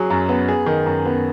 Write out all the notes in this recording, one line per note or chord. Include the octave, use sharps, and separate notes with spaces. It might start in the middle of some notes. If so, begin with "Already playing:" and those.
Already playing: F#3 G#4
F#2
B3
G#4
D#3
F#2
B3